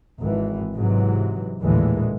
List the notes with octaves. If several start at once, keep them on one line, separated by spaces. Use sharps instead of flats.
G#1 E3
G#2 C3 E3 F#3
A1 D#2 A#2 D3 E3 G#3